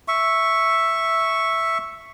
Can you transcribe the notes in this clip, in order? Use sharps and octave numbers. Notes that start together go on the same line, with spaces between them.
E5 C#6